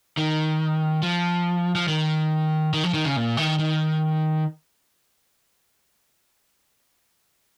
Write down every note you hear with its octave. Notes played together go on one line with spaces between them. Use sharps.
D#3
F3
F3
D#3
D#3
F3
D#3
C#3
A#2
D#3
D#3